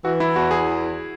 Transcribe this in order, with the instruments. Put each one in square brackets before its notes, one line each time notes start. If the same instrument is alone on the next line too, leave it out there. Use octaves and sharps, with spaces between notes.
[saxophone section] E3 [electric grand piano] F#4
[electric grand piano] E4
[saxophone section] E2 [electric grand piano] F#4
[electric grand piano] G#4